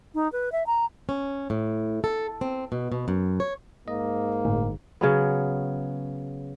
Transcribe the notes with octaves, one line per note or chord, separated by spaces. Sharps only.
D#4
B4
E5
A#5
C#4
A2
A4
C4
B2
B2
F#2
C#5
G#2 A#3 D#5
G1 A2
C#3 F#3 B3